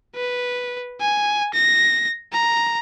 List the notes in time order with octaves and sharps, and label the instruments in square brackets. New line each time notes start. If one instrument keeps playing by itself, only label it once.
[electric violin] B4
G#5
A#6
A#5